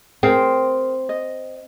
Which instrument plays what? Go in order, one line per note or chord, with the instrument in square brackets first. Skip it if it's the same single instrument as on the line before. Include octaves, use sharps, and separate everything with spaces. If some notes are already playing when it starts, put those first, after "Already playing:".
[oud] C4 [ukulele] G#4 A#4 G5
[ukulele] D#5